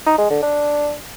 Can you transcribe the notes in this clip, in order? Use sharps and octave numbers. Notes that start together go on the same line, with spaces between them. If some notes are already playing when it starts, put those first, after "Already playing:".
D#4
G#3
D3
D4